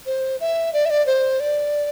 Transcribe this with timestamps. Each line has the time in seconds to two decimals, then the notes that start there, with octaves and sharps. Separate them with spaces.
0.06 C5
0.40 E5
0.73 D5
0.85 E5
0.90 D5
1.06 C5
1.40 D5